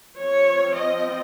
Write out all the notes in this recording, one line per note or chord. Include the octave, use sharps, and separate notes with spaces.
F3 C4 C#5
D#5